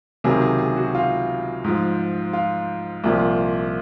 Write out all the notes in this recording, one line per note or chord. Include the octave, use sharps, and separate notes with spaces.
C#2 C3 D#3 F#3 G#4
G#4
G#4
F#4
F4
G#2 F3
F4
C2 A#2 F3